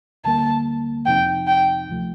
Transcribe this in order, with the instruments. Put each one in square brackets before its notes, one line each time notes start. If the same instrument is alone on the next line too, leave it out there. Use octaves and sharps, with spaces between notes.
[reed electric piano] D2 D3 G3 A#3 [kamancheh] A5
[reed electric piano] F2 C3 F3 C4 D#4 [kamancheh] G5
[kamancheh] G5
[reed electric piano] D2 C3 F3 A3